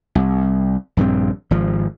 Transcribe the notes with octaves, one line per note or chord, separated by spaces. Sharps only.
C2
A#1 G2 D3 C4
G#1 F3